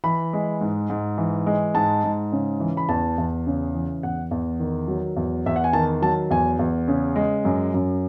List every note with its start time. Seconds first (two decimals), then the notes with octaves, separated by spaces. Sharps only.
0.04 E3 B5
0.33 G#3
0.61 G#2
0.90 G#2
1.18 E3
1.47 G#3
1.75 G#2 A5
2.04 G#2
2.32 C#3
2.60 E3
2.77 B5
2.89 E2 A5
3.18 E2
3.47 C#3
3.75 E3
4.03 E2 F#5
4.31 E2
4.60 D#3
4.88 F#3
5.16 E2
5.46 E2 E5
5.56 F#5
5.64 G#5
5.73 D#3 A5
6.02 F#3 A5
6.30 E2 G#5
6.59 E2
6.88 C#3
7.16 G#3
7.45 F#2
7.74 F#2